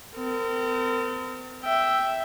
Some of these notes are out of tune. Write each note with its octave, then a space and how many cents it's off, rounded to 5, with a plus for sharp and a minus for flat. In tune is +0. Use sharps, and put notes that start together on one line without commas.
C4 -40 A#4 -35
E5 +0 G5 -5